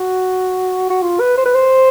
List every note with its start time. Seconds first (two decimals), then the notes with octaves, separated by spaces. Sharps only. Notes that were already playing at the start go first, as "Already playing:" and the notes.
Already playing: F#4
0.90 F#4
1.02 F4
1.20 B4
1.38 C5
1.46 B4
1.55 C5